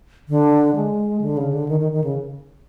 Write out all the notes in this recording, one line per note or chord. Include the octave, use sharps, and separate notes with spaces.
D3
G#3
D3
C#3
D3
D#3
D#3
D#3
C#3